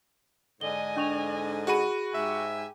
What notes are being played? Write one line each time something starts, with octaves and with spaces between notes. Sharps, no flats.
G#2 D3 D#5 G#5 G7
D4 C#6 F7
F#4 G#4 F#5 B5 D#7
G#2 G4 E5 G#5